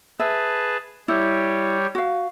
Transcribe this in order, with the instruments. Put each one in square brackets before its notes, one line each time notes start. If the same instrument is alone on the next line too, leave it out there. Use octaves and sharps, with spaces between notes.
[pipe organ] G#4 B4 A5 [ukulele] E5
[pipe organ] G3 G4 C#5 [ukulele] E4
[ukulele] F#4 F5